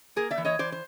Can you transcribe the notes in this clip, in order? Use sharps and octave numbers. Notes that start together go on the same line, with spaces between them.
A#3 G#4 A#4
D5 E5
E3
C#5 D#5
E3 C5 D5
C5